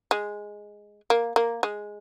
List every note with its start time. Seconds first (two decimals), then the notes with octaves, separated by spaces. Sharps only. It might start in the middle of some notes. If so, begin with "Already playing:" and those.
0.11 G#3
1.10 A#3
1.36 A#3
1.63 G#3